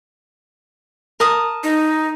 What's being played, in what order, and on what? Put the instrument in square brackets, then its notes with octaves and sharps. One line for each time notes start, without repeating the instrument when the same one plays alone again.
[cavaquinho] A#4 A5 D#6
[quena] D#4